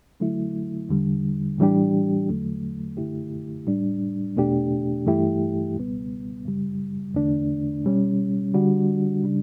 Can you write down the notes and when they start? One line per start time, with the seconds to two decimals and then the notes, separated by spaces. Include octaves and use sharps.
0.20 D3 F#3 A3 E4
0.89 E2 D3 G3
1.58 A2 E3 G3 D4 G4
2.28 E2 D3 F#3 A3
2.97 F#2 D3 A3 E4 G4
3.67 A2 G3 D4
4.37 E2 B2 A3 D4 G4
5.06 G2 E3 A3 E4 G4
5.76 C#2 B2 G3 B3
6.45 F#2 C#3 G3
7.14 E2 D3 A3 D4
7.84 B2 G3 C#4
8.53 D3 G3 D4 F#4
9.24 C#3 G3 D4